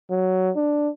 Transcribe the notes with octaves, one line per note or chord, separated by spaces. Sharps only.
F#3
D4